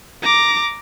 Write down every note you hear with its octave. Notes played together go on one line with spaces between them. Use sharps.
A#5 D6